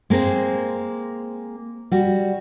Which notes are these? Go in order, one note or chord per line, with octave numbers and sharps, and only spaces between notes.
G#3 A#3 C4 G#4 C5
G3 F#4